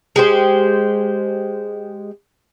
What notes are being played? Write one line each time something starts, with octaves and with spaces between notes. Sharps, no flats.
G#3 G4 C5